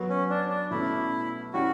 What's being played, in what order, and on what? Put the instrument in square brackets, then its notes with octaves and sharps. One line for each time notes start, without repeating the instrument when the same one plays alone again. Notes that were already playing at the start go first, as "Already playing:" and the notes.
Already playing: [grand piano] F#3 B3 F#4
[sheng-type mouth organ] C#4
D4
D4
[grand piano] B2 A3 C#4 [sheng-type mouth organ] E4
[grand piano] E3 G3 C#4 G4 [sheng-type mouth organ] F#4